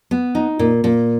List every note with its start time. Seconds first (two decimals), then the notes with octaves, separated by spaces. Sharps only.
0.11 B3
0.35 D#4
0.59 A#2
0.84 A#2